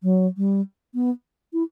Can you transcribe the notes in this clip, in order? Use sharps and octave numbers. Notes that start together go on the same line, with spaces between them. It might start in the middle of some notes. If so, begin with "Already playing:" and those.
F#3
G3
B3
E4